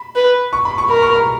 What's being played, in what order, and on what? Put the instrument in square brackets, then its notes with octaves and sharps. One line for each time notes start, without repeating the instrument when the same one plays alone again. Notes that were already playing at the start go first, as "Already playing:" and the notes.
Already playing: [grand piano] B5
[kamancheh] B4
[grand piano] C#6
B5
C#6
[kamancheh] A#4 [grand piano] B5
[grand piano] C#6
A#5